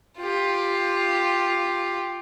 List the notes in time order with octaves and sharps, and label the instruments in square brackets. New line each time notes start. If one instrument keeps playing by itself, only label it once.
[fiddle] F4 G4